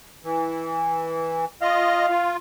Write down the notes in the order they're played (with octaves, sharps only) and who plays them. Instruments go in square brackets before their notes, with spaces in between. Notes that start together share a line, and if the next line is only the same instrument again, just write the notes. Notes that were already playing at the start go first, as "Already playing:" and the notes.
[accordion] E3
[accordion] F4 D#5 [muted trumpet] F5
[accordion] F4